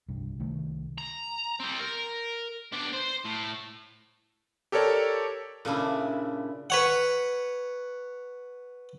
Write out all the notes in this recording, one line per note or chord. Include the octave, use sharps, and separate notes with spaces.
C2 G2
C2 D#3 A3
A#5
G3 C4
A#4
B3 D4
C5
A2
G4 A4 A#4 C#5 D5
A#2 C#3 D4 E4
B4 C#5 F#5